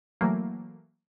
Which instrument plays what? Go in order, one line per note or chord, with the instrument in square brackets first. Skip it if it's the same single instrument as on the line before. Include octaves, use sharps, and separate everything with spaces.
[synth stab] E3 F#3 A3 A#3